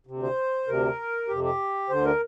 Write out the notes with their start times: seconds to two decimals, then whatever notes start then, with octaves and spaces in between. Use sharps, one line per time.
0.07 D2 C3
0.23 C5
0.67 D2 C3 A#4
1.28 F2 C3 G4
1.44 G4
1.89 D2 D3 C5
2.05 A#4